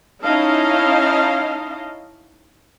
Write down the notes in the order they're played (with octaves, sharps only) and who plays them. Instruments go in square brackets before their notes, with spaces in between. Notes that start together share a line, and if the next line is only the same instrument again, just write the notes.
[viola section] C#4 D#4 E4 D#5 F5 A5